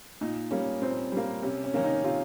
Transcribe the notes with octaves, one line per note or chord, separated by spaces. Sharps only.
A#2 D#4
G3 A#3 C#4
A#2 C4
G3 A#3
C3 C#4
C#4
D#3 A#3 C#4
D#4
C3 F4